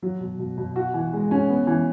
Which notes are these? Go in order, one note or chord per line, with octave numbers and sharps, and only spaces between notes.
F#3
B2
B2
B2
F#4
E3
G#3
C#4
B3
E3